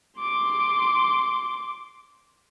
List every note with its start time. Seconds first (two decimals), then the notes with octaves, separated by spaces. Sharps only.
0.19 C6 D6